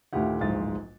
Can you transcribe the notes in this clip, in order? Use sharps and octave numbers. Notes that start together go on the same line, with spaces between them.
D2 A2 D#3 F4 G4 F#5
D1 A#1 G#2 F4 A6